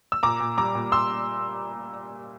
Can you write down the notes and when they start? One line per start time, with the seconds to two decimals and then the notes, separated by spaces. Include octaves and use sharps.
0.12 E6
0.23 A#2 A#5 D6
0.40 A#2
0.58 G3 A#5 D6
0.75 A#2
0.92 A#2 C6 E6